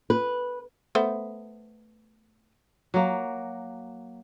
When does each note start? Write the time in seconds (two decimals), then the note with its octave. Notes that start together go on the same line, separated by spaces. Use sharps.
0.10 B4
0.95 A3 B3 C5
2.94 F#3 A#3